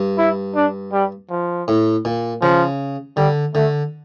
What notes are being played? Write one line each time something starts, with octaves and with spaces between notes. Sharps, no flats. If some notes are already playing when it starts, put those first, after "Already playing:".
Already playing: G2
E4
D4
G3
F3
A2
A#2
C#3 F3
D3 G3
D3 A3